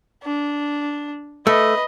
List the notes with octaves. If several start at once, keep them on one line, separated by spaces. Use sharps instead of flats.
D4
A3 B4 D#5